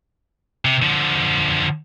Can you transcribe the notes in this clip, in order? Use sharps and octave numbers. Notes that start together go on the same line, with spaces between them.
C3
D3 F3